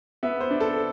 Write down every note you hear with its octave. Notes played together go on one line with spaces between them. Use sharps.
B3 E5
C5
D4
A4